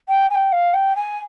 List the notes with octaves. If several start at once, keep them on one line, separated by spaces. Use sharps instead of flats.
G5
G#5
G5
F5
G5
G#5